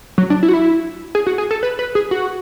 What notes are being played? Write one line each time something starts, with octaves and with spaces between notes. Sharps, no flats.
F#3
D4
E4
F#4
E4
G#4
F#4
G#4
A4
B4
B4
G#4
F#4